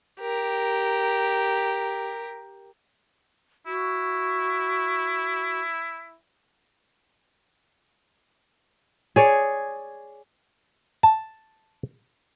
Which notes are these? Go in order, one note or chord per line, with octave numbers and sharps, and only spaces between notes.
G4 A#4
E4 F#4
G#4 C#5 D5
A5